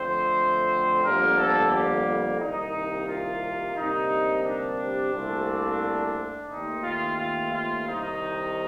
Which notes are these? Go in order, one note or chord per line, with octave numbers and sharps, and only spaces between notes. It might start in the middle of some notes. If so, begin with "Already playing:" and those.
Already playing: F2 D3 A3 C4 C5
G1 F2 D3 G3 A#3 A#4
A4
G4
C2 C3 D#3 A#3 D#4
F4
D2 C3 G3 A#3 D#4
D4
C2 A#2 A3 C4
D#2 D#3 A3 C4 D#4
F4
F4
F4
C2 C3 D#3 D#4